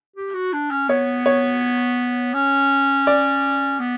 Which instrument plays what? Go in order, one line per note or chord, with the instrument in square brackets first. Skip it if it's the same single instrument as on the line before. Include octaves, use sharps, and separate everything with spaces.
[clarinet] G4
F#4
D4
C#4
[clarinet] B3 [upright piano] C#5
[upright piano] C#5
[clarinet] C#4
[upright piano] D5
[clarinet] B3